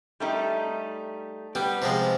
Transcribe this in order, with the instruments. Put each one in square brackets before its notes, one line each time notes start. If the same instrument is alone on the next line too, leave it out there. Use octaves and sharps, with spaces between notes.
[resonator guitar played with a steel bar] G3 A3 D#4
[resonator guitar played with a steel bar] G3 [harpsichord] B3
[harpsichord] C3 F3 G#3